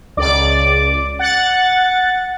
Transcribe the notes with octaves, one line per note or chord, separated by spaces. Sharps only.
C#2 D5 D6
F#5 A6